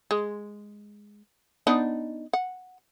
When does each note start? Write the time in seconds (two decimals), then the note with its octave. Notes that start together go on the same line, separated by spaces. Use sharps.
0.11 G#3
1.67 B3 D4 D#4
2.33 F#5